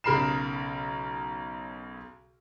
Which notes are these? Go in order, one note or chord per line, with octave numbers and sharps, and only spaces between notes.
B1 C#3 A#4 B5 C7 E7